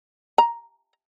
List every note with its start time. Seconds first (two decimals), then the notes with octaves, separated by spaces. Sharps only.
0.38 A#5